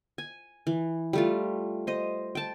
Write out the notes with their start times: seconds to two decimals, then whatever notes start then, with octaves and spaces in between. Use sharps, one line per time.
0.18 G#5
0.67 E3
1.13 G3 A3 F4
1.87 C5 D#5
2.35 G5 A5